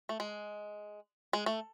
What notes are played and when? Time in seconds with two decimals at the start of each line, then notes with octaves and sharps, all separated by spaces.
0.09 A3
0.20 G#3
1.33 G#3
1.46 A3